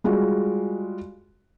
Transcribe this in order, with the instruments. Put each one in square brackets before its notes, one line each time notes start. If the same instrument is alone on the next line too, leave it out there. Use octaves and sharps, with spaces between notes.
[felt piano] G3 G#3 F4 F#4